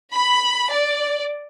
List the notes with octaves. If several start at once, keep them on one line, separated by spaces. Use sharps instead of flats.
B5
D5